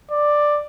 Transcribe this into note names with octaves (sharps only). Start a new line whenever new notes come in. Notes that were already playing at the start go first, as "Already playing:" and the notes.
D5